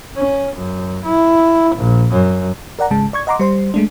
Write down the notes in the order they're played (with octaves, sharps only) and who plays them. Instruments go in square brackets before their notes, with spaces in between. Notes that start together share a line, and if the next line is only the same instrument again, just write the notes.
[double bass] C#4
F#2
E4
A#1
F#2
[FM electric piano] A#4 D5 F#5 A#5
G#1 C#3 G#3 A5
D5 C#6 G#6
D#5 F#5 A#5 C6 D6
G3 C5 C6
G#3 A3 D4